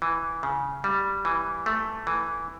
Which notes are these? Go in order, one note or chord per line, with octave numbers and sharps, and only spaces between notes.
E3
C#3
G3
E3
A3
E3